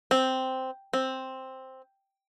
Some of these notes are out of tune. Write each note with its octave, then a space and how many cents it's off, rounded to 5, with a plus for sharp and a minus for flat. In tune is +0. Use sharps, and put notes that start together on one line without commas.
C4 -5
C4 +5